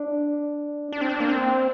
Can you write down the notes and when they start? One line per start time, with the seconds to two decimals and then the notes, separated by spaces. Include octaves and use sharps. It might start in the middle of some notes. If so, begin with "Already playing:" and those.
Already playing: D4
0.93 D4
1.01 C4
1.09 D4
1.20 A#3
1.29 C4